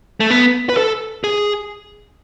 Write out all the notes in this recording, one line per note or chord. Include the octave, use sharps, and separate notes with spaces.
A3
B3
B4
A4
G#4